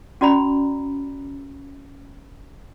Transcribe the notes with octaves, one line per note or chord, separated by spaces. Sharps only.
C#4 F#4 D5 A#5 B5